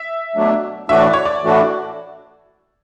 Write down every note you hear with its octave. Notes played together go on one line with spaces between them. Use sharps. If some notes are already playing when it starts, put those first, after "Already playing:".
Already playing: E5
B2 F#3 A3 D4
A2 E3 A3 D4 F#4 E5
D5
C#5
D5
A2 E3 A3 D4 F#4